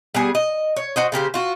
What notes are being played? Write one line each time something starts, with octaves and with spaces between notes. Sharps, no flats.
G3 B3 G#4
D#5
C#5
F#4 C5 D#5
C#3 A#3 G4 C5
F4 F#4